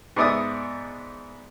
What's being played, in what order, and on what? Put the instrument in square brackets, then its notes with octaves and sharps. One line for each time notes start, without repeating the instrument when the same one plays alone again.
[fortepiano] G#2 B3 D5 E5 D#6